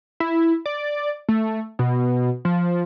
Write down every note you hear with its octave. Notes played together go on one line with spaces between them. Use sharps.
E4
D5
A3
B2
F3